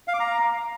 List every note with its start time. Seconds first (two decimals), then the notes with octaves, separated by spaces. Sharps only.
0.08 F5
0.14 D6
0.20 A#5